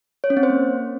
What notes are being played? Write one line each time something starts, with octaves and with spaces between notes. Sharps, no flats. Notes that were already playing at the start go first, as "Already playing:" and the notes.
C#5
C#4
C4
C5
A#3